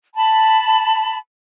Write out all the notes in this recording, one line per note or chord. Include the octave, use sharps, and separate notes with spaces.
A5 B5